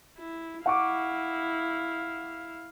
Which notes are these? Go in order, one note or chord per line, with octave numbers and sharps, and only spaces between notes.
E4
E4 F5 F#5 C#6 D6